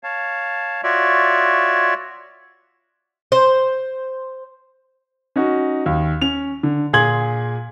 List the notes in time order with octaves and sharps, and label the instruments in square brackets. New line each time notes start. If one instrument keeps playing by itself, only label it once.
[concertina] C#5 F5 A5
F4 F#4 C#5 D5 E5
[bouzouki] C5
[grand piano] C#4 D#4 F#4
D#2
C#4 F7
D3
A#2 G#4 G#5 C6 G#6 F#7